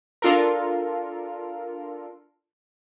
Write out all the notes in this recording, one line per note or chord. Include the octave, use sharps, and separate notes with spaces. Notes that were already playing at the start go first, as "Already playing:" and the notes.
D4 F4 A4 A#4